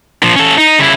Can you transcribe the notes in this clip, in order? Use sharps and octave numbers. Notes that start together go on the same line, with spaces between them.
A#2 F3
C#4 A4
D#4
C#3 E4